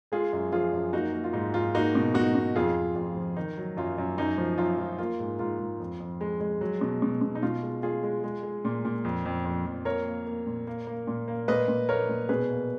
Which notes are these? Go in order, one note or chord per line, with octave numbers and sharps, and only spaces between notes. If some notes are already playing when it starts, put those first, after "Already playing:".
G#3 F4 G#4
F#2
F3 F4 G#4
F#2
A#3 D#4 F#4
A#3
F4
G#2 D#4
G#2 F4
A#3 D#4 F#4
B2
B2 D#4 F#4
B2
F2 F4 G#4
F2
F2 F4
F3
D#3 D#4
F#3
F#2 F4
F#2
F#2 D#4
F3
F#2 F4
F3
A#3 F4
G#2
G#2 F4
G#2
F2
F2
G#3
G#3
F#3
B2
B2
B2
D#4
B2 F4
G#3
G#3 F4 G#4
G#3
G#3
G#3
A#2
A#2
F2
F2
F2
F2
A#3 A#4 C#5
A#3
A#3
A#2
A#3
A#3
A#2
A#3
A#2 B4 D#5
A#2
A#3 A#4 C#5
A#2
B2 G#4 B4
A#3